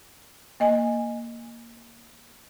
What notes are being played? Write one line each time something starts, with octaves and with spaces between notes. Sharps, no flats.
A#3 D#5 G#5